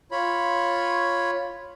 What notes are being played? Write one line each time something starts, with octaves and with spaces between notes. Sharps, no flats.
F4 C#5 B5